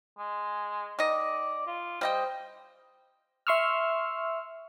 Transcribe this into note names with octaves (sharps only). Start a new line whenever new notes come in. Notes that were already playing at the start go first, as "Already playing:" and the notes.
G#3
D#3 D5 D#5
F4
G3 C5 D#5 G5
E5 C6 C#6 E6 F6